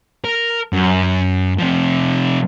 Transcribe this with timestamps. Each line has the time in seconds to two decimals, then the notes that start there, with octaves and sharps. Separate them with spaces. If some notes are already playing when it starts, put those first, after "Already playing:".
0.25 A#4
0.73 F#2
1.59 C3 F3